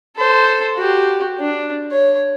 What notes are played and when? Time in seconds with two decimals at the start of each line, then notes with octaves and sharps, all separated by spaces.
0.16 A4 C5
0.76 F#4 G4
1.40 D4
1.91 C#5